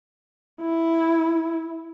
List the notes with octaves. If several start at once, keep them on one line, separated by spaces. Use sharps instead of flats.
E4